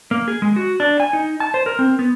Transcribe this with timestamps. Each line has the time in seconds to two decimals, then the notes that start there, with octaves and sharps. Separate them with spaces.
0.11 A#3
0.28 G#4
0.42 G#3
0.56 F#4
0.80 D4
1.00 G#5
1.13 D#4
1.40 A5
1.54 C5
1.66 A#4
1.79 C4
1.99 B3